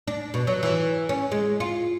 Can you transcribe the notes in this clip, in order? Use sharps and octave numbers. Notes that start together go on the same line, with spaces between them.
D4
B2
F#3
E3
C#4
G#3
F4